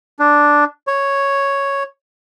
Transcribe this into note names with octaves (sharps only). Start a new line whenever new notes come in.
D4
C#5